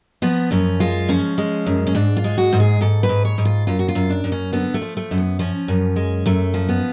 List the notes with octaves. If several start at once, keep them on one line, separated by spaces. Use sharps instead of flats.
F3 B3
F#2 C#4
G#3 F4
F3 C#4
G#3
F#2
C#4
G#2 D4
F4
G#3
F#4
G#2
G#4
G#2 A4
B4
G#2
C#5
G#2
F4
F#2 F4
F#4
F4
F#2
D4
F#2
C#4
D3 B3
A3
F3
A3
F#2
B3
F3 C#4
F#2
G#3
F#2 A3
F3
B3